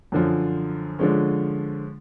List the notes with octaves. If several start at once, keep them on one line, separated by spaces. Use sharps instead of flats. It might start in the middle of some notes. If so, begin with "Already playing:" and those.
F#2 D3 F3
D3 F3 G#3 C#4